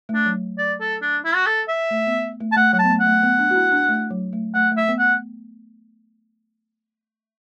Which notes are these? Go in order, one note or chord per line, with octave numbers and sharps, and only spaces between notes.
A3
D4
F#3
D5
A4
D4
E4
F#4
A4
E5
A3
B3
A3
A5
A3 F#5
F#3 F#5
A5
B3
A3
F#5
A3
B3
D4
F#4
E4
D4
A3
F#3
A3
A3 F#5
A3
E5
B3
F#5